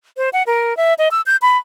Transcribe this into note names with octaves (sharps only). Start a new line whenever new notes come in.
C5
F#5
A#4
E5
D#5
E6
G6
B5